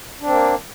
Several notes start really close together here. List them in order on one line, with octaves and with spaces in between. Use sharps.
D4 C4 A#3